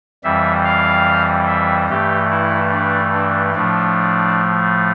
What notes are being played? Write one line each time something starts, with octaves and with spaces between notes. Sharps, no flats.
F2 E3 G3 E5
F5
E5
G2 E3 A3 G4
E4
D4
D4
A2 F3 A3 D4